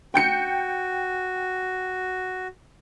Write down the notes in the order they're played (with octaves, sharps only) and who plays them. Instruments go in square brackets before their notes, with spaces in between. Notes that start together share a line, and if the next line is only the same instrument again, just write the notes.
[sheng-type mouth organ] F#4 [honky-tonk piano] G5 G6 C#7